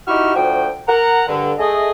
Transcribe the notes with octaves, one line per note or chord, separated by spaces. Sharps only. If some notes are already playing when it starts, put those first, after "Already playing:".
D#4 E4 F#4 G4 C#6 F6
D2 F3 F#4 G5
A#4 F#5 A#5
G2 D3
A3 G#4 D#5